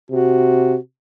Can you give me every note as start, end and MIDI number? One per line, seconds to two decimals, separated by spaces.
0.11 0.76 48
0.11 0.77 66